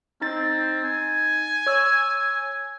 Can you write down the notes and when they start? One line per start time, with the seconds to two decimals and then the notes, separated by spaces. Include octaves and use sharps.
0.21 C4 D#4 A6
0.84 G#5
1.67 C#5 E6